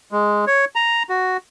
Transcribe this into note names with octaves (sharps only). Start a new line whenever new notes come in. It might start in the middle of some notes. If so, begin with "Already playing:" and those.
G#3
C#5
A#5
F#4